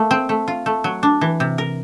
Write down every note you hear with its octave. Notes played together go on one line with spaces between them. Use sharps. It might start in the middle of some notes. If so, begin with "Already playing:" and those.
Already playing: A3 A#3
C4
A3
F4
A3
F#3
D4
E3
C3
A#4